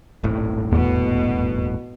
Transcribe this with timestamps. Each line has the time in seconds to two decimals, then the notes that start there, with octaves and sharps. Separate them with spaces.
0.23 D#1 G#1 A2
0.72 E2 B2